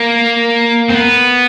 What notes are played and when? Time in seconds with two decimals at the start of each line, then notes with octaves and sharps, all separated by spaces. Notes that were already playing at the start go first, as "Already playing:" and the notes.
Already playing: A#3
0.89 C4
0.94 B3